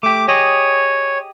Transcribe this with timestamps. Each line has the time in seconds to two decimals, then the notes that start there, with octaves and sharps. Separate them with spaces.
0.03 A3 G4 D6
0.28 G4 G#4 C#5 D#5